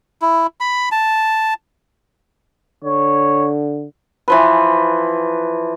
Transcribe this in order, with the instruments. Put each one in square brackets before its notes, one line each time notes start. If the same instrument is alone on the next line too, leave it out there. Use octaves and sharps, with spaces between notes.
[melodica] E4
B5
A5
[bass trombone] D3 [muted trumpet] C#5
[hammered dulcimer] E3 F3 B4